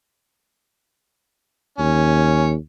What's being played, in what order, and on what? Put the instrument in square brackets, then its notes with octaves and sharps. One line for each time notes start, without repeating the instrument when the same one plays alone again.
[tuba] D#2 [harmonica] C#4